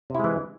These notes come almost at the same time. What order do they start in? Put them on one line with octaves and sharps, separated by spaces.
C3 E4 G#3 E3